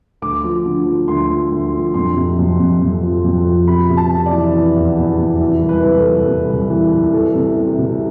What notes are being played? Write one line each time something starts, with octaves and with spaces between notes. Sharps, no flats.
D2 D6
F3
D3
F3
D2 C6
F3
D2
F3
F2 C6
C3
F2
F2
F2
F3
F2
F3
C3 B5
C3
A5
C3
D5
E3
E3
E2
E2
C3
E3
C2
B4
C2
A4
C2
C3
C2
E3
C2
E3 A4
C3
C3
C3